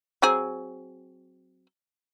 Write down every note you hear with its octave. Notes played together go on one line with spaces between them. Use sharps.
F#3 C4 G#4